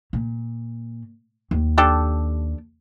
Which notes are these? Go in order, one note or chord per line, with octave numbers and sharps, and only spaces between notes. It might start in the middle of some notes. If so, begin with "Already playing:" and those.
A#2
D#2
D4 G4 A4